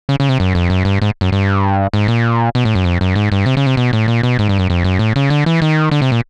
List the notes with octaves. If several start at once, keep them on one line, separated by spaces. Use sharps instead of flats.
C#3
C#3
C3
F#2
F2
F#2
G2
G#2
F#2
G2
G#2
A#2
B2
A2
F#2
F2
F#2
G#2
G2
C3
C#3
C3
B2
A2
A#2
B2
G#2
G2
F#2
F2
F#2
A2
C#3
D3
E3
D#3
D3
C3
A#2